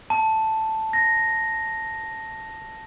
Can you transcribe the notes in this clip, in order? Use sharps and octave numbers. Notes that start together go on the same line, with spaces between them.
A5
A#6